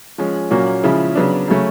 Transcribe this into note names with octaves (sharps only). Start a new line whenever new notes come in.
F3 G#3 C#4
A#2 F#3 A#3 C#4 F#4
C#3 F3 G#3 C#4 E4
C#3 F#3 B3 D4
C#3 F#3 A3 C#4